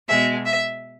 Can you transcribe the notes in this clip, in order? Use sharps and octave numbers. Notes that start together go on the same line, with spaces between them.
B2 G#3 E5
E5